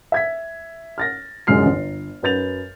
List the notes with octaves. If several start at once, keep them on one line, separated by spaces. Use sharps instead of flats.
E5 G#6 B6
F6 A6 A#6
G1 C2 F#2 G#3 F6 C7
G1
F#2 B4 G6 A6 F7